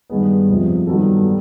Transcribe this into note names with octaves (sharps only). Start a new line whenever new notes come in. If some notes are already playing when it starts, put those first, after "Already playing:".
G2 D#3 G#3 B3 G#4
F2 C3 F3
G2 D#3 F#3 B3 A4
G3